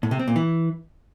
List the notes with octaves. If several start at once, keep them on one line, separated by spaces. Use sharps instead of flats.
A2
C3
C4
A#2
E3